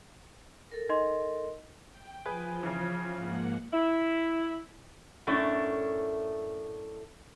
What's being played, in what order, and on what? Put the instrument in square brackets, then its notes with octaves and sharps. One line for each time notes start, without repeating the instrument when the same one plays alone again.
[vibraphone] A4 A#4
[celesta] D#4 D#5 C6
[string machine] G5
[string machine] F3 [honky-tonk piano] G#4 B4 G#5
[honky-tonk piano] C#3 E3
[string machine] G#2 A#3 F#5
[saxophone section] E4
[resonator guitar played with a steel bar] F#2 A2 A3 C#4 D4 E4